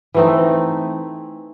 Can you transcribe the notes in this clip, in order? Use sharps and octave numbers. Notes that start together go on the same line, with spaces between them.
E3 A3 C4 D#4